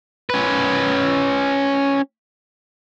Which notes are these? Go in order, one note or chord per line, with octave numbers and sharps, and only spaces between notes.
C#4 B4